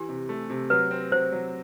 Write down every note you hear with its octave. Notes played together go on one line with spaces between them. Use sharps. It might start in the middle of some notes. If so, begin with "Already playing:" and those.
Already playing: E3 G4
C3
A3
C3
F#3 B4
C4
F#3 C5
F#3